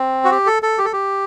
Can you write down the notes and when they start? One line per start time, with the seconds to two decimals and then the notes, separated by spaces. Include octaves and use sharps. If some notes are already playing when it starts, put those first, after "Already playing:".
Already playing: C4
0.25 F#4
0.31 G4
0.46 A4
0.63 A4
0.78 G4
0.85 A4
0.93 G4